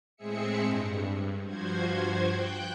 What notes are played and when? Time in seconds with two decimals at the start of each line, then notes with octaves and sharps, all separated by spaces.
0.17 A2 G#3 C4 G#4 E5 C#7
0.62 G2
1.45 G2 F3 F#4 C5 G#6
2.27 G5 F#6 G6